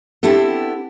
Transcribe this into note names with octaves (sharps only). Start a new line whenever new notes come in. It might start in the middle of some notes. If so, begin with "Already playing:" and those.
B3 C4 D4 E4 G4 A4